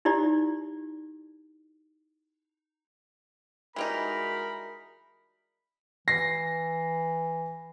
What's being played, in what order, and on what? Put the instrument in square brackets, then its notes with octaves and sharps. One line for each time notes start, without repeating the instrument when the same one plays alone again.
[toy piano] D#4 E4 G4 D5
[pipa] E3 G3 D#4 [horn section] G#3 F#4 A#4 [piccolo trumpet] B5
[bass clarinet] E3 [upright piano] A#6 C7